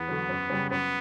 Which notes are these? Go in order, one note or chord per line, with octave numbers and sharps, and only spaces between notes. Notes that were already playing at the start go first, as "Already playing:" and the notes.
Already playing: E2 B3
D3 F#3
F#2
C#3 G3 C#4
F#2 B3